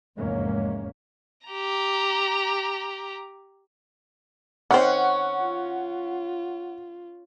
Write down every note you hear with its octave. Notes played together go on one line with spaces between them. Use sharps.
F1 E2 G#2 G#3 A#3 C#4
G4 A#5
D#3 C4 C#4 F#5
F4